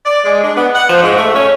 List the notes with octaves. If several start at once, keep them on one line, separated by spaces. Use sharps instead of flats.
D5
G#3
D4
B3
F#5
F3
G#2
A3
C#4